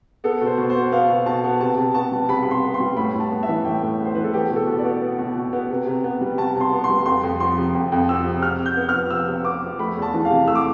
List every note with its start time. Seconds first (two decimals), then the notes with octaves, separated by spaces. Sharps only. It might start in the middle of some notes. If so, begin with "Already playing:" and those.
0.24 B3 A4
0.41 B2
0.46 C5
0.58 B2
0.70 C5
0.75 B3
0.92 B3 F5
1.10 B2
1.26 B2 A5
1.44 B3
1.60 C3 A5
1.78 C3
1.94 B3 A5
2.12 G3
2.29 C3 B5
2.43 C3 B5
2.51 C6
2.63 B3
2.74 C6
2.80 G3
2.97 A2 B5
3.14 A2
3.20 A5
3.31 B3
3.43 E5
3.48 E3
3.65 A2 G5
3.83 A2
4.00 B3
4.05 C5
4.15 E3 B4
4.24 A4
4.33 B3 G4
4.51 B2
4.56 A4
4.67 B2
4.79 D5
4.85 B3
5.01 B3
5.18 B2
5.35 B2
5.53 B3
5.70 C3
5.87 C3
6.04 B3
6.21 G3
6.38 C3 A5
6.55 C3
6.61 C6
6.72 B3
6.84 C6
6.89 G3
7.06 F2 C6
7.23 F2
7.40 F3 C6
7.58 C3
7.74 F2
7.92 F2
8.08 F3 E6
8.25 C3
8.42 C3 F6
8.60 C3
8.66 G6
8.77 B3
8.89 F6
8.94 F3
9.11 C3 E6
9.28 C3
9.45 B3 D6
9.63 F3
9.79 A3 B5
9.96 E2
10.02 A5
10.14 E3
10.25 F5
10.30 C3
10.47 A3 E6
10.55 D6